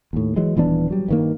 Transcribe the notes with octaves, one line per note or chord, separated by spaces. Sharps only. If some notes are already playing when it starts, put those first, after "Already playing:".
D#2 A2
E3 F#3 G#3
D#1 E3 B3 D4
F#3 G3
G2 D#3 A#3